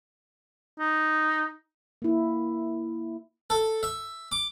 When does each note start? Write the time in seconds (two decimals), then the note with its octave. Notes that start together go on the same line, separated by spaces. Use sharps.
0.79 D#4
2.02 A#3 E4
3.50 A4
3.83 E5
4.32 D6